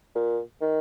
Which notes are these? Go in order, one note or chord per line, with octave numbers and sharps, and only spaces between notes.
A#2
D#3